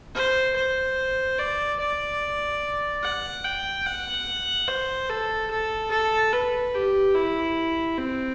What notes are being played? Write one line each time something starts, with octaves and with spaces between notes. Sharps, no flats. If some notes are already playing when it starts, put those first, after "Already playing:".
C5
C5
D5
D5
F#5
G5
F#5
C5
A4
A4
A4
B4
G4
E4
C4